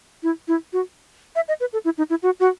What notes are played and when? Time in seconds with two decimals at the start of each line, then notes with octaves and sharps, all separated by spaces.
0.23 E4
0.48 E4
0.73 F#4
1.36 E5
1.48 D#5
1.60 B4
1.73 A4
1.85 E4
1.98 D#4
2.10 E4
2.23 F#4
2.40 F#4